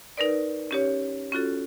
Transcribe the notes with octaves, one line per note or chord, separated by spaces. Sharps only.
D#4 A#4 B4 D5
C#4 G4 C#5
C#4 F4 F#4 A4